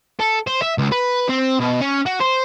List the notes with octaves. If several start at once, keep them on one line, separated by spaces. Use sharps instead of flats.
A4
C5
E5
C#2
B4
C4
B2
C#4
F#4
C5